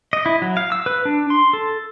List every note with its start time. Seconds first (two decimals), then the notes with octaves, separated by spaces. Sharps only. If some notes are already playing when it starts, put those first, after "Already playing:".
0.13 D#5
0.26 E4
0.42 F#3
0.57 F5
0.72 E6
0.86 B4
1.05 D4
1.30 C6
1.53 A4